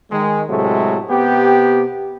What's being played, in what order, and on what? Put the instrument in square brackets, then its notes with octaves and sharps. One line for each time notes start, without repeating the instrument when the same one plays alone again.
[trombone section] D#3 G#3
A2 C3 F#3 G#3 A3
C3 B3 G4